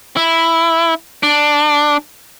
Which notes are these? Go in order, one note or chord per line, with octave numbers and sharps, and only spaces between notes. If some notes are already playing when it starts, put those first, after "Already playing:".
E4
D4